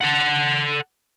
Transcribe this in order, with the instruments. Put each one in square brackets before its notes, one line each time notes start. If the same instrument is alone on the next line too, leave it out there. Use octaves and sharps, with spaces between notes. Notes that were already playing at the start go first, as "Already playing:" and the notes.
[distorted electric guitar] A4 F#5